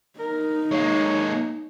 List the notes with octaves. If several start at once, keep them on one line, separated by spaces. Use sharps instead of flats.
D#4 A#4
G#3 A#3 C#5